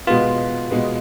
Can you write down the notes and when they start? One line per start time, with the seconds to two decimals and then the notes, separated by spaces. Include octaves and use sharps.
0.07 B2 G#3 B3 F4
0.71 B2 G#3 B3